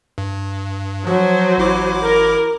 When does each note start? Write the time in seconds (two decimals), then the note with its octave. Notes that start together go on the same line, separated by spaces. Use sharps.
0.18 G2
1.07 F3 F#3 C5
1.58 A1 E4 D6
2.04 A#4